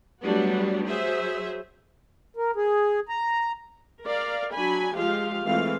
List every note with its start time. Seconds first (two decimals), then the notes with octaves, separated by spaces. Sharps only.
0.22 F#3 G3 A3 B3 D4 F#4
0.86 F#3 G#4 C5 E5
2.36 A#4
2.56 G#4
3.09 A#5
4.03 A#4 D5 F5
4.52 F#3 D4 G#5 B5
4.96 F3 G#3 F4 G4 F5
5.45 E3 G#3 A3 C4 F4 F5